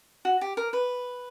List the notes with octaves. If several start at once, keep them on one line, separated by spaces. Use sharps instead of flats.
F#4
G4
A#4
B4